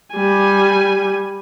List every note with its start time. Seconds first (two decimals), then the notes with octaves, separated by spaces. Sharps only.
0.15 G3 G#5